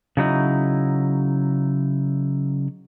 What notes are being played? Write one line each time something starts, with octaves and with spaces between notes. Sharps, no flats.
C#3 F#3 D#4 E4